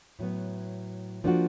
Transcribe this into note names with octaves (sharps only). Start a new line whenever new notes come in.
A2 F#3 B3
F3 A#3 D4 F#4